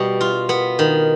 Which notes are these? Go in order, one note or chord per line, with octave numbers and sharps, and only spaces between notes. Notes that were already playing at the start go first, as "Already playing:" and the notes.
Already playing: B2 G3 G4
F4
B3
D#3